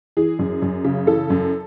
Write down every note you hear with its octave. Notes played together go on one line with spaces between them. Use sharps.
E3 G#4
F#2
F#2
C#3
E3 A4
F#2